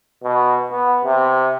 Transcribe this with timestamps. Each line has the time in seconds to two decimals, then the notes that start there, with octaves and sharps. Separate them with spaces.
0.24 B2
0.71 B3
1.05 C3